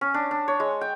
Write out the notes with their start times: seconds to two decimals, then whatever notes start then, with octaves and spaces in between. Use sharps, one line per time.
0.01 C#4
0.14 D4
0.31 D4
0.48 C#5
0.60 G#3
0.81 G5